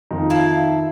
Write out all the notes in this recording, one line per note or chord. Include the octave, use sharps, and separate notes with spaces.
F2 D#3 D#4 F4
E4 F5 A5